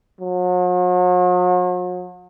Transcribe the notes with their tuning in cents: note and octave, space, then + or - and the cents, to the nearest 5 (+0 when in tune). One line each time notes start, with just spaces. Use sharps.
F#3 -45